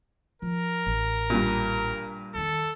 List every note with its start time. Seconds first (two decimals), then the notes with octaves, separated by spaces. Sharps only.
0.42 F3 A#4
0.86 A1
1.30 G2 A#2
2.34 E2 D#3 A4